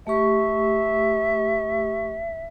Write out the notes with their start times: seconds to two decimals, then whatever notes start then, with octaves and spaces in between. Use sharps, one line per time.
0.07 A3 G4 E5 C#6